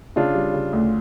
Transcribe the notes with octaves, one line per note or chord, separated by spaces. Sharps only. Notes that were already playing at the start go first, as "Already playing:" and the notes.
C#3 D4 F4
G3
C#3
D2